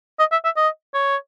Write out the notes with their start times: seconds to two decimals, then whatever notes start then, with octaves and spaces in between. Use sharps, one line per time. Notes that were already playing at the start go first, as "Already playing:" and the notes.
0.19 D#5
0.32 E5
0.45 E5
0.57 D#5
0.94 C#5